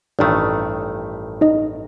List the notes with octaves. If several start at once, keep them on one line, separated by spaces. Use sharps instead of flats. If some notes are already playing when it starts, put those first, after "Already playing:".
A1 G2 D#3 A3 D4 D5
D#4 D#5